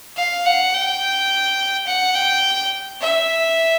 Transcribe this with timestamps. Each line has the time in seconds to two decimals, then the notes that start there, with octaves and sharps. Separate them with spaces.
0.17 F5
0.46 F#5
0.74 G5
1.87 F#5
2.15 G5
3.01 E5